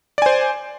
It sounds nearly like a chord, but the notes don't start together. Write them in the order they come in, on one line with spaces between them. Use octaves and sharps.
D5 G#5 C5